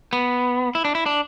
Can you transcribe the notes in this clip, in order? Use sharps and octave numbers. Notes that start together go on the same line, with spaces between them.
B3
E4
D4
E4
D4